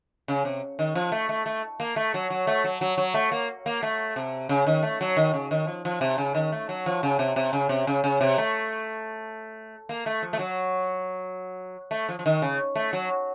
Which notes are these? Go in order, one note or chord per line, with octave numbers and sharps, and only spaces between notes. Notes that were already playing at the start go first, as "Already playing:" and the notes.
C#3
C3
D#3
F3
A3
A3
A3
A#3
A3
F#3
F#3
A3
F#3
F#3
F#3
A3
A#3
A#3
A3
C3
C#3
D#3
A3
F#3
D#3
C#3
D#3
F3
F3
C3
C#3
D#3
A3
F#3
F3
C#3
C3
C3
C#3
C3
C#3
C#3
C3
A3
A#3
A3
F3
A3
F#3
A3
F3
F3
D#3
C#3
A3
F#3